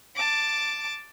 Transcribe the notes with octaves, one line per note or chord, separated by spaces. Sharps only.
A5 D6